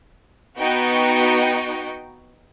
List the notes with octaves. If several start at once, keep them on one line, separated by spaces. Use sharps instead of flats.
B3 D#4 F#4 G5